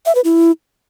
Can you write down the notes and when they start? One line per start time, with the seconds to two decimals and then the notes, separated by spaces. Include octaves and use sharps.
0.06 E5
0.15 B4
0.24 E4